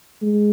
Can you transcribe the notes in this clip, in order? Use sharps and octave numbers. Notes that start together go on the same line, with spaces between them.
G#3